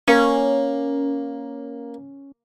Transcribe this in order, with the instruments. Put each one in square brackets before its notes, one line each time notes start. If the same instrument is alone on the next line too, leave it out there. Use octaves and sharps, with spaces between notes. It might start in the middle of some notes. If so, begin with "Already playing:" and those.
[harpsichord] A#3 [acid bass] C#4